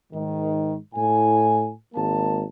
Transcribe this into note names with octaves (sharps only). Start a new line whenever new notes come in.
G#2 D#3
A2 G#5
G#1 G#3 A#3 A5